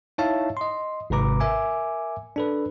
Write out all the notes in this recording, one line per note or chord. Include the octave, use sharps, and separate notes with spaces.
D#4 E4 C#5 E5 F5 A5
D#5 C6
G#1 G#2 C3 B4 A#5 D6
A#4 E5 G#5 D6
D4 A4 B4